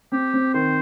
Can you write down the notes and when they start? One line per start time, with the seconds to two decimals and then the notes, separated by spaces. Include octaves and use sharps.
0.12 C4 G4
0.34 C4
0.54 D#3 C5